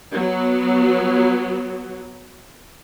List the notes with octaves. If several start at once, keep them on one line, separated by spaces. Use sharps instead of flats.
F#3 B3